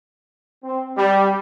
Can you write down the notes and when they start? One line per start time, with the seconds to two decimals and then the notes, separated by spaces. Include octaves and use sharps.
0.64 C4
0.97 G3